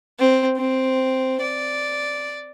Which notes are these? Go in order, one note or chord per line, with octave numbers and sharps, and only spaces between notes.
C4
C4
D5